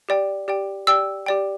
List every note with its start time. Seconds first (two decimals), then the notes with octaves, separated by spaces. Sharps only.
0.09 G4 D5 G5
0.48 G4 D5 G5
0.87 G4 D5 G5 E6
1.26 G4 D5 G5